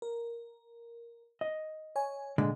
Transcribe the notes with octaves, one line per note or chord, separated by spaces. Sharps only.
A#4
D#5
C#5 G#5
A#2 D3 G#3